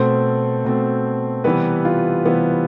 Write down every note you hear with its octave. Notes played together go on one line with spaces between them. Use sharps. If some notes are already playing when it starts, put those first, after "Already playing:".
Already playing: B2 A3 C4 A4 C5
B2 A3 C4
C3 E3 G3 B3 G4 B4
F4
C3 E3 G3 B3